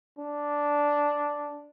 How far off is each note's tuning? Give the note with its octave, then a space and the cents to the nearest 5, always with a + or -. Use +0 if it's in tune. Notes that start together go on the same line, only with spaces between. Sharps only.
D4 -5